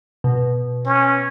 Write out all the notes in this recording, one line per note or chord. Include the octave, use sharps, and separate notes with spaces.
B2
C#4